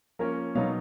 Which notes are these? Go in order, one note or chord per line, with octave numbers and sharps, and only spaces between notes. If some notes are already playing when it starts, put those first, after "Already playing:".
F3 A#3 C#4 A#4 C#5
B2 F#3 B3 D#4 C#5 F5